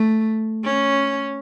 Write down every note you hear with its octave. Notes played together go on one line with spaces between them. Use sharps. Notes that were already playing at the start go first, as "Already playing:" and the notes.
Already playing: A3
C#4